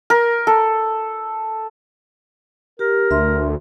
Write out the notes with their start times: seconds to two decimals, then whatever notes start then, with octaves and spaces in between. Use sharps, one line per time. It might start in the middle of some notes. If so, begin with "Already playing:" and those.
0.10 A#4
0.47 A4
2.79 G4 A#4
3.11 D2 E5 C6